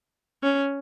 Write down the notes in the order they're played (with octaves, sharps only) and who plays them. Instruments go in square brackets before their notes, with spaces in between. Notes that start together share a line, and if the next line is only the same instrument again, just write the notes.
[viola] C#4